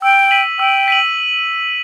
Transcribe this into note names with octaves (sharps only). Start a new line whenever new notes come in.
G5 E6
B6 D#7 F#7
G5 E6
B6 D#7 F#7